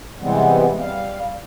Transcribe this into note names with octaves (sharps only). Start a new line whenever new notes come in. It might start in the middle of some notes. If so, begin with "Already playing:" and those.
C3 E3 G3 G#3 B3 C4
G3 F5